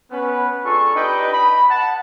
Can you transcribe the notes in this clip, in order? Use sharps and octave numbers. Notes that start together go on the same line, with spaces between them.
B3 C#4 B4
D4 F4 G#4 A4 C#6
D4 D#4 G4 B4 D#5 G5
B5
F#5 A5